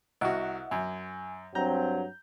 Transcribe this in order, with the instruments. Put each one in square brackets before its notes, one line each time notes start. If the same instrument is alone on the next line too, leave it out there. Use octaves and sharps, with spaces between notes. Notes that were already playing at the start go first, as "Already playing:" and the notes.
[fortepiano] C2 F#4 [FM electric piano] D#5 E5 F#5
[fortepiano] F#2 [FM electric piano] G#5
[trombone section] G2 F#3 C4 [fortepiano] A#5 [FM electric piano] G6